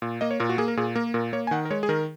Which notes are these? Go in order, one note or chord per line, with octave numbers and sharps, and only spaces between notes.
A#2
A#3 D#5
C#5
A#2 A#4
F#4
A#3 G#4
A#4
A#2 G#4
A#3 A#4
A#2 A#4
A#3 C#5
G#5
D#3 F#5
A#4
G#3 C#5
G#4
D#3 A#4